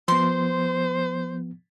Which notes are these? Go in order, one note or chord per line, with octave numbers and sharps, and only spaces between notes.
F3 B3 C5 C6